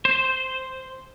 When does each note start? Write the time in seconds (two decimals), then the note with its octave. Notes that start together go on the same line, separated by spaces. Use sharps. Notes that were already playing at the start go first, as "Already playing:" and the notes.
0.05 C5